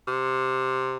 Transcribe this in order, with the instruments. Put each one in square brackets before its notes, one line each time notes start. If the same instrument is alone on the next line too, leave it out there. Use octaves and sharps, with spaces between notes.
[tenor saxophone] C3